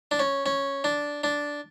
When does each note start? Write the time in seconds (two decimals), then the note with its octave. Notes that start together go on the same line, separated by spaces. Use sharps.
0.11 D4
0.19 C#4
0.46 C#4
0.84 D4
1.24 D4